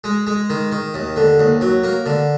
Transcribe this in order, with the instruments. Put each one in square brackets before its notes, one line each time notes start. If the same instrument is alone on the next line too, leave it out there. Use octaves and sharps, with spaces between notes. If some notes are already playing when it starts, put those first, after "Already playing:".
[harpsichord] G#3
G#3
D#3
D#3
D#2
D3
D#2
F#3
A#3
D3